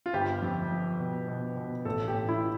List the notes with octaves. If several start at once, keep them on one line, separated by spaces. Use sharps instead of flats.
F4
G1 G4
F2
F3
B2
B2
B2
A1 A4
G4
A1
E4